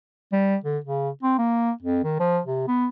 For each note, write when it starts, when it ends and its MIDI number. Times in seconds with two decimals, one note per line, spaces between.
0.32 0.56 55
0.64 0.78 50
0.84 1.09 49
1.23 1.38 60
1.38 1.71 58
1.82 2.03 41
2.04 2.17 51
2.20 2.40 53
2.45 2.63 48
2.68 2.87 59